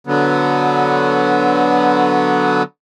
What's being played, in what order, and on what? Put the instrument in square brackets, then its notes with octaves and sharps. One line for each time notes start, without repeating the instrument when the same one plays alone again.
[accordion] D3 F#3 B3